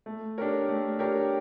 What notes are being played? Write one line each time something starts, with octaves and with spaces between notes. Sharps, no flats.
A3
D4 G4 A#4 C#5
A3
D4 G4 A#4 C#5